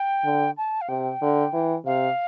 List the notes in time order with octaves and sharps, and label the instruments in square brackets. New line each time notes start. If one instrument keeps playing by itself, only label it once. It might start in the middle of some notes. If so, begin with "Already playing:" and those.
Already playing: [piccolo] G5
[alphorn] D3
[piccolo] A5
F5
[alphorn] C3 [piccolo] G5
[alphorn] D3
E3
[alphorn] C3 [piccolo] F5